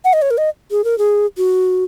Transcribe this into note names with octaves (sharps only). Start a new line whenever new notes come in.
F#5
D#5
C#5
A#4
D#5
G#4
A#4
G#4
F#4